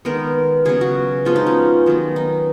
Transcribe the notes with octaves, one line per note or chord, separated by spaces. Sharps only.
D#3 G#3 B3 A#4
C#3 F#3 B3 G#4
F#4
F3 G#3 B3 F4
D#4
C#4
D#3 F#3 B3
D#4